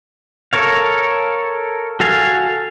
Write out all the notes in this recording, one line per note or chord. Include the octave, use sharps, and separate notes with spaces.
A4 A#4 C#5 F5
F#4 A4 F5 G#5